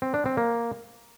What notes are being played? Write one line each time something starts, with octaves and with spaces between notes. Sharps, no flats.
C4
D4
C4
A#3